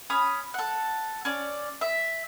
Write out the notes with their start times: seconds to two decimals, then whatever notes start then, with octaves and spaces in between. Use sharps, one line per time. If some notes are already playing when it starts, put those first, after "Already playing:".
0.10 C#4 B5 D#6
0.54 A4 F#5
1.25 C#4 D5
1.81 E5